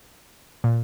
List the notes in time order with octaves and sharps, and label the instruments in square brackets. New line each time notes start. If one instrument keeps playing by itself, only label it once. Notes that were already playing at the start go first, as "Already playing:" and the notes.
[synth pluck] A#2